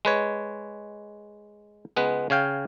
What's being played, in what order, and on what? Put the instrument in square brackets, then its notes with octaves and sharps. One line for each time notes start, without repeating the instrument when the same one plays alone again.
[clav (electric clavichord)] G#3 B4 C#5
C#2 G#3 B3 B4
C#3 C#5 F5 G5